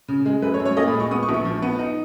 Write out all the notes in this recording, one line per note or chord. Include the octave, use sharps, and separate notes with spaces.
C#3
G#3
F#2 B4
C#5
F#2
C#5
A#2 D#5
B5
G#3
C#6
B3 D#6
C#6
A#1
C#6
F3
B3
D#4